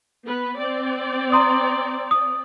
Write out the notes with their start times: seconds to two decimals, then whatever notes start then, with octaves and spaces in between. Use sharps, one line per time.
0.24 B3 B4
0.58 C4 D5
1.32 A#5 C6 D#6
2.11 D#6